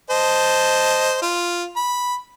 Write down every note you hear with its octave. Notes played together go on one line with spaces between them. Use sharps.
C5 D#5 A5
F4
B5